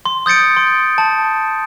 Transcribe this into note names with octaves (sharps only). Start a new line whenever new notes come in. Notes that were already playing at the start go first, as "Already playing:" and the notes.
C6
D#6 G6 A6 C#7 D7
C6
A5